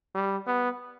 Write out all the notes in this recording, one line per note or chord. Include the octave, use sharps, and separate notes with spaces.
G3
B3